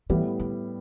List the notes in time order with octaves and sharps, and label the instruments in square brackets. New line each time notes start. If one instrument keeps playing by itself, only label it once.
[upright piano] A2 G3 B3 E4 [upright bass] E3
[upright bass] D3